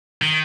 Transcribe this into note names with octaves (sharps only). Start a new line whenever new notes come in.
D#3